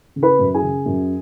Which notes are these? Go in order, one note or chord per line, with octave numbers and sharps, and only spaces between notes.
C#3
B4 B5
F#2
G#4 G#5
C#3
F#2